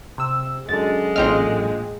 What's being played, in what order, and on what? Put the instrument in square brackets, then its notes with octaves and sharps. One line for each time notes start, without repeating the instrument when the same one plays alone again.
[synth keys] C3 E6
[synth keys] F#2 D3 [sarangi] G#3 [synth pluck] A6
[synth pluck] A1 F6 [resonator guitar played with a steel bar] A#2 C4 D#5